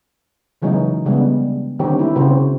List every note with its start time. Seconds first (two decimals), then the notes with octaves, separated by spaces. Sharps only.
0.62 C#3 E3 F#3 G#3 C#4 D#4
1.05 C#3 G3 G#3 B3 C#4 D4
1.79 D3 D#3 G3 C4 G4 C#5
1.97 A3 E4 G4
2.16 C#3 C4 F#4 C5 C#5